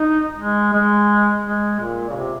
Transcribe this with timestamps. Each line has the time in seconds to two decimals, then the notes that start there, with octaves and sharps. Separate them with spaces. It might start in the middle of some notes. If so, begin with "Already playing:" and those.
Already playing: D#4
0.38 G#3
0.73 G#3
1.44 G#3
1.80 A#2
2.10 C#3
2.16 C3